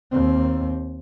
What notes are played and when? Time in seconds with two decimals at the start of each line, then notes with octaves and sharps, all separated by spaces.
0.12 D#2 C4